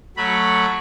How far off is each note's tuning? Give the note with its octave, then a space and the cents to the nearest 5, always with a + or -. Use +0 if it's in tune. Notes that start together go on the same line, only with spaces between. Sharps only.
F#3 +0 A3 +10 B5 -10